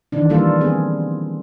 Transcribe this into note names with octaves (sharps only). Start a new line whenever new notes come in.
D#3 E3 D4
E3 F3 G3 A#3 F4 A4
B3 C4 G#4